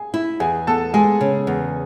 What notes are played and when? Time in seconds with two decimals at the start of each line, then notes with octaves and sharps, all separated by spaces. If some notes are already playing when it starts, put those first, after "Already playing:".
Already playing: G#4 G#5
0.14 E4
0.40 E2 G#4 G#5
0.67 B3 A4 A5
0.94 G#3 G#4 G#5
1.21 C#3
1.47 E2